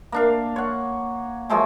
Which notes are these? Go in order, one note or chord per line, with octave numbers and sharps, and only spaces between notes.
A#3 D4 F5
C#5 F#5
F3 F#3 G#3 A3